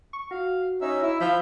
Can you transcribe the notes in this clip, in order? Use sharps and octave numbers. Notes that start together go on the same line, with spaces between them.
C#6
F#4 F5
C#4 D#4 E5
E4 E5
F3 E5 B5 G6